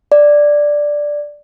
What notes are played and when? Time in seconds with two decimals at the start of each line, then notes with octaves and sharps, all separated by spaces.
0.12 D5